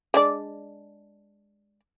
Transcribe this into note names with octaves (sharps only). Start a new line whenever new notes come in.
G#3 D4 D5